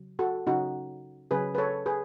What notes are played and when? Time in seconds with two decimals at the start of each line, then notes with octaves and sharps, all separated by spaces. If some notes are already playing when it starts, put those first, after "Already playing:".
Already playing: C#3 F#3
0.19 F#4 A4
0.47 C#3 F#3 C#4 D#4 F#4
1.31 C#3 F#3 C#4 G#4 B4
1.55 B4
1.58 A4 C#5
1.86 G#4 B4